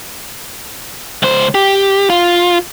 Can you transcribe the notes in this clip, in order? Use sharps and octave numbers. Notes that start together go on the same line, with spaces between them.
C#2 C5
G4
F4